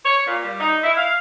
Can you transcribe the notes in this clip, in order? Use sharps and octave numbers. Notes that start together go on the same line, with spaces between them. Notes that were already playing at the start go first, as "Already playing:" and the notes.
C#5
A#2
G3
D#4
E4
F5